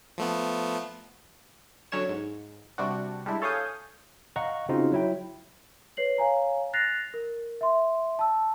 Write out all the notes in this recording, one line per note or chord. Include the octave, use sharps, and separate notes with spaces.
F3 A3 B3
D3 F#3 C#4 C#5 E7
G#2
C3 G3 D4 F#4
G3 G#3 D4 E4
A4 C#5 F5 G#5 D#6 G6
D#5 F5 F#5 A#5 C#6
C#3 C4 D#4 F4 F#4
F#3 E4 G5
B4 C#5 C7 F#7
C#5 F5 G#5 A#5
F#6 A6 A#6 C7 F7
A#4
E5 C6
A5 E6